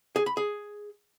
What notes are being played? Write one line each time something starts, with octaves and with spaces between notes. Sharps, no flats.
G#4
B5
G#4